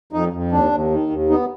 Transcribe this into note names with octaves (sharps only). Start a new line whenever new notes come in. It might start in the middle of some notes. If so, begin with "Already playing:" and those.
F2 D#4
F2
D#2 D4
D#2
D#3
D#2
B3 D#4